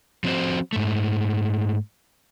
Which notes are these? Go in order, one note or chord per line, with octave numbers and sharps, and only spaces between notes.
F3 C4 F#4 C5
G#2 A3